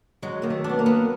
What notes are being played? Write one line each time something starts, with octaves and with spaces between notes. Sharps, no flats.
F#3 G#3
D#3 A#3
A3
B3 D4
A#3
B3